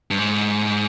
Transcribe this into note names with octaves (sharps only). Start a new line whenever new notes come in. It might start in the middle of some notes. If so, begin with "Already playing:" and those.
G2
G#2